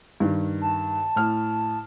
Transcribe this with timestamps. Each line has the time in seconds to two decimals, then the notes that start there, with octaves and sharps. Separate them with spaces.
0.20 G2 D#3
0.61 A5
1.16 A2 F6